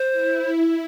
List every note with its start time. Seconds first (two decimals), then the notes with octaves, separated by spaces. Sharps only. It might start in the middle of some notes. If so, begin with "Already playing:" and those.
Already playing: C5
0.11 E4